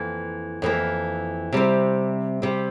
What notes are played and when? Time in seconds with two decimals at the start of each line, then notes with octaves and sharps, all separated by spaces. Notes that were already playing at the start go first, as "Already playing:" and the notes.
Already playing: F2 E3 A#3
0.62 F2 E3 A#3
1.53 C3 G3 C4
2.42 C3 G3 C4